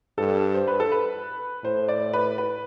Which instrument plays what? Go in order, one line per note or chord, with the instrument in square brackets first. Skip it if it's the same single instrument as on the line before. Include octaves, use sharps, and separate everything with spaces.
[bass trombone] G2 [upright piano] A4
[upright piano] C5
B4
A4
B4
[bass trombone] A2 [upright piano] C5
[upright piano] D5
B4
B4